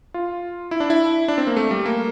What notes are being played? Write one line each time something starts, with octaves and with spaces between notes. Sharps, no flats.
F4
E4
D4
E4
D4
C4
A#3
A3
G3
A#3